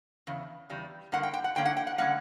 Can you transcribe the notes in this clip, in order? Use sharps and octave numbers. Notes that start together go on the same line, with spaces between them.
E2 C#3
E2 C#3 G3
G2 D3 A#3 F#5
G5
G5
F#5
G2 D3 A#3 C#4 G5
F#5
G5
F#5
D3 G3 A#3 C#4 F#5